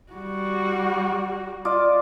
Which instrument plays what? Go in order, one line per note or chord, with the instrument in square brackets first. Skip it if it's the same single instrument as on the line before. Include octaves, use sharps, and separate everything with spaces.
[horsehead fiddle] G3 F#4
[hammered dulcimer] F4 D5 D#5